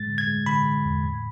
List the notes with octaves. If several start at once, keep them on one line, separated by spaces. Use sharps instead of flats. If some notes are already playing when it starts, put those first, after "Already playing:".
Already playing: A2 G#3 A6
D3
G#6
G#3
D3 B5
G#3
E2
A2